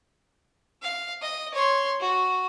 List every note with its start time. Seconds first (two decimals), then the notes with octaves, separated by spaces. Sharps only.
0.82 F5
1.22 D#5
1.54 C#5 C6
2.00 F#4